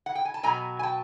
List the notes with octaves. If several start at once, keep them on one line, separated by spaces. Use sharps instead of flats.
F#5
G5
G#5
A5
B2 F#3 B3 G#5 A#5
G#5
G5 A5